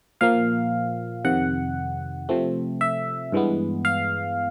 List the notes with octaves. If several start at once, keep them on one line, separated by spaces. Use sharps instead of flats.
A#2 F3 A#3 F5
F2 C3 D#3 F#5
C3 F3 A3 C4
E5
G2 E3 G#3 B3
F5